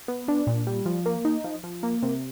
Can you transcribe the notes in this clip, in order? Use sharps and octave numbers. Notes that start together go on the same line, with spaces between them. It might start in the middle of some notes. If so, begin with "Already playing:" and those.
B3
D4
A#2
G3
F3
A#3
D#4
F3
F3
A#3
C3